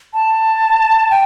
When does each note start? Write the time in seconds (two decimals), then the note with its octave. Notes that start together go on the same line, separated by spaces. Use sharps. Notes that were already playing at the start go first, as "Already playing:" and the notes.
0.14 A5
1.10 G5